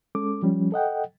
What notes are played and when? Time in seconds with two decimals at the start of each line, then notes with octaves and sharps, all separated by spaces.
0.15 G#3 C#4 A4 D6
0.42 F3 G3 C#4
0.72 A4 D#5 F#5 G5